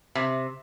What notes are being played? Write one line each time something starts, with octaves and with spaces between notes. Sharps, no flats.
C3